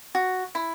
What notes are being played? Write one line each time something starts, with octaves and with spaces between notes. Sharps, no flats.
F#4
E4